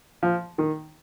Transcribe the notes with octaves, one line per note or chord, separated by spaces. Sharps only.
F3
D#3